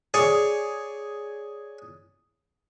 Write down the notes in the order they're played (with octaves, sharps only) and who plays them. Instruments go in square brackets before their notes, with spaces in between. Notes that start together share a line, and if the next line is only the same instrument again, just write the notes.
[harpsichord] G#4 C#5 D5